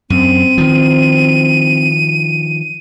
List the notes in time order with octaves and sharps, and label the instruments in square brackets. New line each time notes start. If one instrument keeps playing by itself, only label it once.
[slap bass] F#2 [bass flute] C4 [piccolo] D#7
[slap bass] D#3 F3